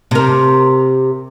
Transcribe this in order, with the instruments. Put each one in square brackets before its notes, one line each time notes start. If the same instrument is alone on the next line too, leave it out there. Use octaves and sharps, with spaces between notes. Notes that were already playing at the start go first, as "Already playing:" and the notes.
[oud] C3 A#4